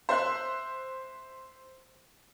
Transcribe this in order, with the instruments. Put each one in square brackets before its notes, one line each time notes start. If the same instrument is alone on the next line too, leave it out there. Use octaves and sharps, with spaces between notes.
[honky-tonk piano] C5 E5 C6 E6 F#6